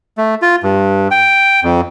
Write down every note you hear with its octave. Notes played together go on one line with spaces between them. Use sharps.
A3
F4
G2
G5
F2